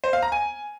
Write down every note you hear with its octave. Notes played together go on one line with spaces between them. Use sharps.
C5
F5
A#5
G#5